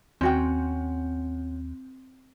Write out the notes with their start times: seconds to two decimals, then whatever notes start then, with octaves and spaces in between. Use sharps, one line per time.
0.21 D#2 C4 C#4 F#4 G5